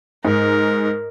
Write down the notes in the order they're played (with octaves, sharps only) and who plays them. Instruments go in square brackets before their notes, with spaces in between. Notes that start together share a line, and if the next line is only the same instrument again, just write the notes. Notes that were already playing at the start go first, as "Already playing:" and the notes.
[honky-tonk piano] G#2 [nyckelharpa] A#4